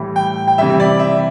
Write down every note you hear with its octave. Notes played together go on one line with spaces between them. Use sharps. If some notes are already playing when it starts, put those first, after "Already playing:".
Already playing: A2 E3 G3
G5
G5
C3 E3 G3 E5
D5
E5